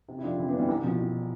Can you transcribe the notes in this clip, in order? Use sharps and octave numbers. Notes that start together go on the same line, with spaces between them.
C3
E4
F2 D4 F4
E3 C4 E4
B3 D4
G1
E3 G3
C2 E3
B2 F3
B2